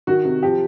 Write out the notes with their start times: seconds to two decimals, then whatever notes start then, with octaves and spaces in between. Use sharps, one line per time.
0.07 D#3 F#4
0.25 C3
0.43 F3 G4